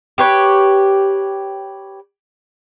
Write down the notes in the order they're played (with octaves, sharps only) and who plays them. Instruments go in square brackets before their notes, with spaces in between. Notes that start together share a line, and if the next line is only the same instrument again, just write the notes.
[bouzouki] G4 B4 C#5